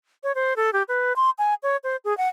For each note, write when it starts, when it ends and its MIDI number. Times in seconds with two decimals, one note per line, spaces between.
0.24 0.32 73
0.35 0.54 72
0.57 0.70 69
0.73 0.83 67
0.88 1.13 71
1.16 1.30 84
1.38 1.54 80
1.63 1.77 73
1.84 1.96 72
2.05 2.16 68
2.18 2.28 78